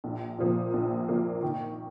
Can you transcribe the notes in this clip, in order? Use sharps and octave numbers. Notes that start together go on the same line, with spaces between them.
A#1
A#2 F3 A#3
A#1
A#2 F3 A#3
D#3